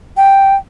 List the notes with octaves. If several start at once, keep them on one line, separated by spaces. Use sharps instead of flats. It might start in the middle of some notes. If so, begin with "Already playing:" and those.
G5